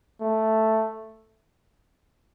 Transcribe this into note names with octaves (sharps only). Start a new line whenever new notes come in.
A3